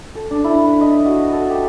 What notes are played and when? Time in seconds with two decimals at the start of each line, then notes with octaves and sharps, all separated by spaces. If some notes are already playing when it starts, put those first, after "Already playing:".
0.15 A4
0.31 D4
0.44 E4
0.65 B4
0.81 D#5
1.05 F#4
1.32 A4
1.50 G4